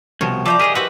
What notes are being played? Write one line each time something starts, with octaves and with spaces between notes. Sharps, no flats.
C2 B2 F3 A#4 C#5
F3 D5 E5 G5 A#5
G4 G#4 A#4 D#5 F5
E4 F#4 G4 B4 C5 E5